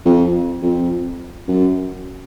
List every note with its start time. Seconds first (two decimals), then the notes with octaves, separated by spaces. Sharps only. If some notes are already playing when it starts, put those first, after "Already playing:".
0.06 F2
0.63 F2
1.48 F#2